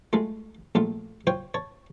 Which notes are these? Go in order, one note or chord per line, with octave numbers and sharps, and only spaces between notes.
G#3 A3 F4
A#1 A3 F4
F4 C5 C#5 G5
C#5 A5